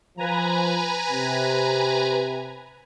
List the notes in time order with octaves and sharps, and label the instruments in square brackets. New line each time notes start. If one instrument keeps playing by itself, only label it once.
[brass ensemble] F3 [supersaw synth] B4 G#5 A#5
[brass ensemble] C3